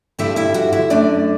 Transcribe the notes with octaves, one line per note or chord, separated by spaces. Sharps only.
G2 D3 G3 E4 E5
E4 E5
F#4 F#5
E4 E5
F#2 D3 A3 D4 D5